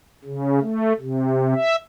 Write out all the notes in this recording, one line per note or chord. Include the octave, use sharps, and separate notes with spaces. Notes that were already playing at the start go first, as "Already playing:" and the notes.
C#3
A3
C3
E5